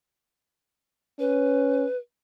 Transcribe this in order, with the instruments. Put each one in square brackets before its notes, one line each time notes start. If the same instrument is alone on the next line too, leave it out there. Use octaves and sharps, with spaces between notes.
[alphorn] C#4 [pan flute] B4